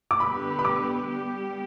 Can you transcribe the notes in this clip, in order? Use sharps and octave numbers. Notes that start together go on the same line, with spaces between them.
D6
D3 G3 B3 G4 B4 B5
B5
D6
G3 B3 G4